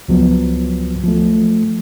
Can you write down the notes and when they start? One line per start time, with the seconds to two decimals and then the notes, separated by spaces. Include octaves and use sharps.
0.08 C#2 F3 F#3 B3
1.04 F3 A3